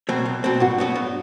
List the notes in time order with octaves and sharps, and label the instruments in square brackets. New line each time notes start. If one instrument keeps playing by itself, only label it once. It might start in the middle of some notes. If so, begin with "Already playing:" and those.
[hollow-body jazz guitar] B2 F#3 C4
C2
B2 F#3 C4
[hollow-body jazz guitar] G2 [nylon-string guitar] F#4
[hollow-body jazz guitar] F#3 B3 F#4
G2